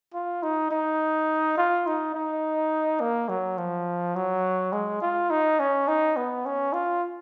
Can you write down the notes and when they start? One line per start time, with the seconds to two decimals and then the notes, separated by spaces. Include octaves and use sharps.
0.14 F4
0.43 D#4
0.71 D#4
1.58 F4
1.87 D#4
2.14 D#4
3.00 A#3
3.29 F#3
3.58 F3
4.16 F#3
4.73 G#3
5.02 F4
5.30 D#4
5.59 C#4
5.88 D#4
6.16 B3
6.46 C#4
6.73 F4